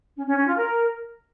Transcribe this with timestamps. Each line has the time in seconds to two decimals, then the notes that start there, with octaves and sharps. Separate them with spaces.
0.15 C#4
0.26 C#4
0.36 C#4
0.46 F4
0.57 A#4